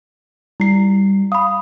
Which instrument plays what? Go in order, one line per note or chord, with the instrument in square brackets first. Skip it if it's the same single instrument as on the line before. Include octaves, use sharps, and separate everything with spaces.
[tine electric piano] G3 [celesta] E4 C7
[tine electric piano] F5 [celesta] B5 D#6